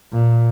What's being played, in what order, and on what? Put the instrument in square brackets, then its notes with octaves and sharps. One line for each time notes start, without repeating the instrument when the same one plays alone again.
[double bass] A#2